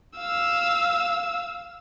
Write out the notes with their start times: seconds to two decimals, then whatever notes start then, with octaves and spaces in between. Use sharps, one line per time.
0.18 F5 E6